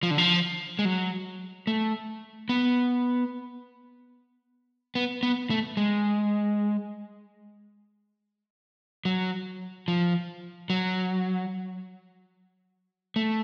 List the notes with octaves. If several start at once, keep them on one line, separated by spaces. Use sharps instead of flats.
F3
D3
F3
G#3
F#3
A3
B3
B3
B3
A3
G#3
F#3
F3
F#3
A3